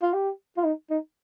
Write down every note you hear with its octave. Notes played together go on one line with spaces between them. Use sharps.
F4
G4
F4
D#4
D#4